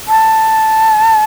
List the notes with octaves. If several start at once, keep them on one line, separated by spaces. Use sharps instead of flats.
A5